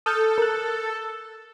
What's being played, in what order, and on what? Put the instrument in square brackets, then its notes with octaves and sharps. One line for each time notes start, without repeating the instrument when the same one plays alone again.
[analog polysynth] A4 [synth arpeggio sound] D#6 F6 G6
[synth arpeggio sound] A#4 F#6